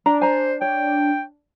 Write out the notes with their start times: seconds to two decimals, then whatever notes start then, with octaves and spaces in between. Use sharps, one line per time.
0.06 D4 A#5
0.21 C5 G#5 A#5
0.62 C#5 G5